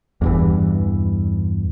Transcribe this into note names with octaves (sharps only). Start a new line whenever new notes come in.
E2 G2 E3